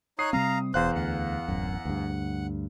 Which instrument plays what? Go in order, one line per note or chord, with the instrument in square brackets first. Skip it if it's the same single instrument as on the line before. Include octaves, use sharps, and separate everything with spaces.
[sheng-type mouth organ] D#4 C#5 F#6 [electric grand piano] D#6 C7
[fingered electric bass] C3 G3 C4 [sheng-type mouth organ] F5 A#5
[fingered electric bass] E1 [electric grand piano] E2 F5 F#6 [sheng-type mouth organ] C5
[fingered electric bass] D2 [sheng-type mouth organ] F#5
[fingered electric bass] D1 F#2
D2 G2